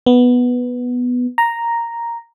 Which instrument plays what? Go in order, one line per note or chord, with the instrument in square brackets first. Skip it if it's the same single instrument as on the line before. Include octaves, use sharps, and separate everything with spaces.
[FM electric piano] B3
A#5